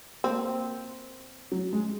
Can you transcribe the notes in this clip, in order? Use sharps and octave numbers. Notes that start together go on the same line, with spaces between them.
A#3 C4
F#3
G#3